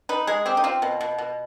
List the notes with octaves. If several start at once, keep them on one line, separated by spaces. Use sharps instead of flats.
D#4 B4
G#3 G#4
C4 G4
D#4
C4 F4
B2
B2
B2